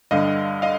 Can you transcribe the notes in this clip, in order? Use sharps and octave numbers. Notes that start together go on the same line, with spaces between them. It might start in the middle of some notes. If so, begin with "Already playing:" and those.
G2 D3 G3 D#5 F5
D#5 F5